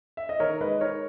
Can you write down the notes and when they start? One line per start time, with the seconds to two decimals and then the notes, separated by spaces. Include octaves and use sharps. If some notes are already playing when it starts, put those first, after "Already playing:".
0.17 E5
0.29 D#5
0.40 D#3 A#4 C#5
0.61 G#3 B4 D#5
0.81 D#4 A#4 C#5